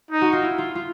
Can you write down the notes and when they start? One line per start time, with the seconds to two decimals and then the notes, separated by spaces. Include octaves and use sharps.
0.11 D#4
0.21 F#4
0.33 F4
0.43 E4
0.58 F4
0.75 F4